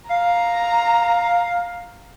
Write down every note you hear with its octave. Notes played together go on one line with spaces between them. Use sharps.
F5 A#5